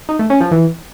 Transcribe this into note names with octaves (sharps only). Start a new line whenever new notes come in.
D#4
A3
C#4
F3
E3